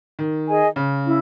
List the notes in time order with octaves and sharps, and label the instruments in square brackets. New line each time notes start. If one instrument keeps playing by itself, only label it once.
[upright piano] D#3
[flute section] G#4 D#5 G#5
[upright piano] C#3
[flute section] C#4 E4